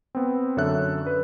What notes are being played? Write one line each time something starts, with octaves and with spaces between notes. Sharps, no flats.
B3 C4
F#2 D3 A4 C#5 E5 F#6
B4